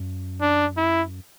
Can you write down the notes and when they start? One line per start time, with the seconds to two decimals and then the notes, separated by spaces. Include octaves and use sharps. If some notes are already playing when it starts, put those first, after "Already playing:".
Already playing: F#2
0.41 D4
0.77 E4